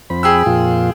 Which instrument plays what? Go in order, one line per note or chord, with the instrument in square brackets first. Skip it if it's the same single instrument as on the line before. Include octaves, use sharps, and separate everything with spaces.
[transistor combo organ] F2 C4 B5
[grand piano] G#4 G5 E6
[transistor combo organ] F2 A#2 F4